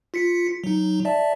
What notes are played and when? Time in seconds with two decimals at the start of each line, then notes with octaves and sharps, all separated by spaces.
0.14 F4 B6 C#7
0.64 F#3 D#4
1.05 D5 E5 A5